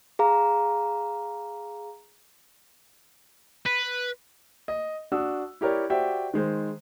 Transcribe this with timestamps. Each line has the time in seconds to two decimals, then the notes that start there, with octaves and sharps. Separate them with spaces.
0.19 G#4 F5 A#5
3.66 B4
4.68 D#5
5.12 D4 F#4 D#6 E6
5.61 E4 G4 A#4 C#5 D5
5.90 F#4 G4 C5 D5 E5 G5
6.34 D#3 G#3 C5